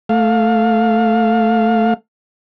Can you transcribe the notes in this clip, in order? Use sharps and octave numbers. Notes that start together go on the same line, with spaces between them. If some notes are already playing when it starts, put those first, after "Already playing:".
A3 F5